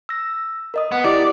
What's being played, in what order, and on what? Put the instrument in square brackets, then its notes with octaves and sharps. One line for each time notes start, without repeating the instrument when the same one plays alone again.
[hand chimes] E6 A#6
A#4 D#5 D#6
[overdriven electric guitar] B3
[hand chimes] E4 G4 D#5 [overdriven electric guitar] D5